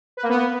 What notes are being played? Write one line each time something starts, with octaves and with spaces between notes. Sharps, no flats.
B4
A#3
B3